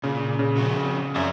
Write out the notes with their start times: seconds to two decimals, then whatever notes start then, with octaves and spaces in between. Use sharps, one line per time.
0.03 A#2 C#3
0.39 C#3
0.57 F3 C4 F#4
1.16 F#2 C5 D5 E5